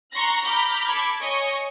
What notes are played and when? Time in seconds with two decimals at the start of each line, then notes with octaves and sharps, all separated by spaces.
0.13 A#5 C6 C#6 F#6 A#6
0.44 A#5 B5 D6 F6 G6
0.87 A4 B5 D6 G#6
1.21 C#5 D#5 G#5 C#6